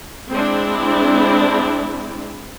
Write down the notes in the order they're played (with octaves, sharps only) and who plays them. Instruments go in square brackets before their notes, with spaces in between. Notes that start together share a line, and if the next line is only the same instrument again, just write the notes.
[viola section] G#3 C4 D4 E4